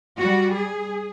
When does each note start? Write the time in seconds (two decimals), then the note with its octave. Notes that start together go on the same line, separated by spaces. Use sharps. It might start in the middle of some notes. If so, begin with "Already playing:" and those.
0.19 G3 F#4
0.55 G#4